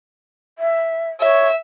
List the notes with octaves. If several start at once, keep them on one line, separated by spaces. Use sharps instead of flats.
E5
C#5 E5